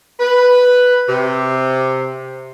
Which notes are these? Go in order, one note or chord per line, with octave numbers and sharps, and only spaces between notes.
B4
C3